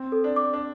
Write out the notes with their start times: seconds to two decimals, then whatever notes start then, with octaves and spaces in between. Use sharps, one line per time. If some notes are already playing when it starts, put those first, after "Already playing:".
Already playing: C4
0.12 A4
0.24 D4
0.36 D6
0.53 D4